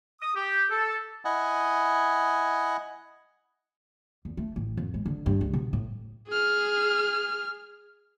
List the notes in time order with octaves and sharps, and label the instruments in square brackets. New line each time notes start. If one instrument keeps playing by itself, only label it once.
[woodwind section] D#6
G4
A4
[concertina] E4 D#5 F#5 G#5
[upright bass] E2
A3
A1
F2
G#3
D3
G2
C#2
B2
A2
[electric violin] G#4 F6